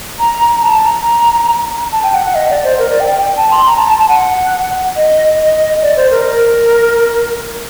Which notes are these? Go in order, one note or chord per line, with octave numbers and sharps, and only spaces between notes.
A#5
A5
A#5
A5
G5
F#5
F#5
D#5
D5
C5
A#4
D5
G5
G5
G5
A5
C6
A#5
A5
A5
A5
F#5
D#5
D#5
D5
C5
A#4
A#4